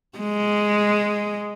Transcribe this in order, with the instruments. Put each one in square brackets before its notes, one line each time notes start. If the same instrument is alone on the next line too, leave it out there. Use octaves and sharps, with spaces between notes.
[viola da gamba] G#3